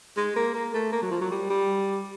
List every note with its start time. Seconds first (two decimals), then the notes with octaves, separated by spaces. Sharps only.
0.17 G#3
0.36 A#3
0.54 A#3
0.74 A3
0.92 A#3
1.02 F#3
1.11 F3
1.21 F#3
1.31 G3
1.50 G3